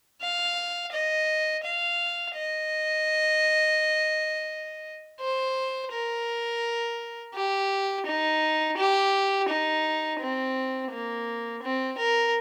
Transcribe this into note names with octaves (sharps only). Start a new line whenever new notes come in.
F5
D#5
F5
D#5
C5
A#4
G4
D#4
G4
D#4
C4
A#3
C4
A#4